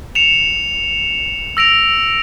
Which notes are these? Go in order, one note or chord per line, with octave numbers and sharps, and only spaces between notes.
C#7 E7 F7
E6 A#6 D7 F7